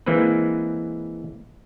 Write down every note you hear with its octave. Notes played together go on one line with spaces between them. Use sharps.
E3 G#3 A#3 C4 B4